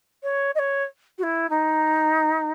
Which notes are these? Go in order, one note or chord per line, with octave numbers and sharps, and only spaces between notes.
C#5
D#5
C#5
F#4
E4
D#4